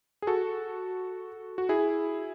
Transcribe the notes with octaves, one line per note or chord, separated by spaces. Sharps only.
G#4
F#4 A4
F#4
E4 G#4